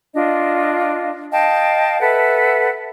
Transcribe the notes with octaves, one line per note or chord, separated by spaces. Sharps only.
D4 F4 D#5
D#5 F5 G5 A5
A4 B4 E5 F#5